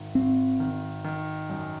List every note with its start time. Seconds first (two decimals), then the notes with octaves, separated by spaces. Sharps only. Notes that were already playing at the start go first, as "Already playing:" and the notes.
Already playing: G#1 D#3
0.15 G#1 C4
0.60 D#3
1.04 D#3
1.50 F#2